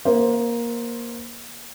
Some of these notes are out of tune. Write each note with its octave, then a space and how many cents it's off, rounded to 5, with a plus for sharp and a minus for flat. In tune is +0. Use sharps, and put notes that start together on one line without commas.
A#3 +15 C5 +0